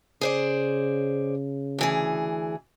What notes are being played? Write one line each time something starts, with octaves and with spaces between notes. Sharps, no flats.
C#3 G#4 C5 D5
D2 E3 G#4